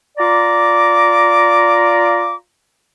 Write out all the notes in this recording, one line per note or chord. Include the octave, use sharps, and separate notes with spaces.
F4 D5 A#5 D6